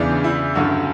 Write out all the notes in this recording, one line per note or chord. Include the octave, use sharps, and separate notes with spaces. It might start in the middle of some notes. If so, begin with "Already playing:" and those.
Already playing: E2 C#3 E3 D4
E4
G2 D3 F#3 C#4 F#4